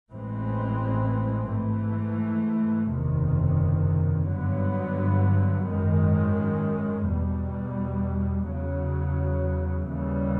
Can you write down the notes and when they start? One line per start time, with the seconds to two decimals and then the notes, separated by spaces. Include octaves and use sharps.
0.11 A1 A2 E3 G#3 C4
1.51 G#2 E3 A3
2.91 F#1 E2 C3 D#3
4.30 G2 D3 F#3 B3
5.70 G#1 F#2 D#3 G#3
7.09 E2 B2 G3
8.49 E2 C#3 F#3
9.89 D#2 C#3 E3 G3